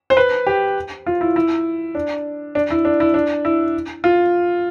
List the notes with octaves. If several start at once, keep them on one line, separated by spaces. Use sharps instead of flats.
C5
B4
G4
F4
E4
E4
D4
D4
E4
D4
E4
D4
E4
F4